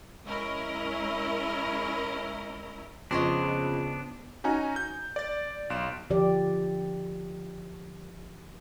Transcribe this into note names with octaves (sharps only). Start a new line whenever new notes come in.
G#3 C#4 E4 A#4 D#5
F2 C#3 B3 D4 C5 C#5 D#5
C#4 D#4 F#4 G#5 A#5
G6
D5 A6
B1 C6 D7 E7
D3 F3 G4 D5